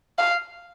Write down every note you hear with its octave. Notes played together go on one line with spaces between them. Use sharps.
F5